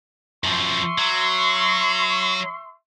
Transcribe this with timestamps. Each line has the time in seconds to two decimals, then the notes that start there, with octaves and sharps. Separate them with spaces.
0.44 F#2 F3 E5 C6 C#6
0.98 F#3